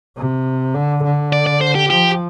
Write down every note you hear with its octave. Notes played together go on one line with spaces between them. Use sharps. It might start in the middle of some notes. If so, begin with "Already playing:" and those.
C3
D3
D3
D5
D5
C5
G4
F3 G4